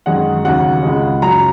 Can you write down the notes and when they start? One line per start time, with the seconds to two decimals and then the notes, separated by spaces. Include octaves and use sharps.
0.06 F#2 D#3 G#3 F#5
0.44 D#2 C#3 F#3 F#5
0.83 C#2 C#3 G#3
1.22 F#2 C#3 F#3 A#5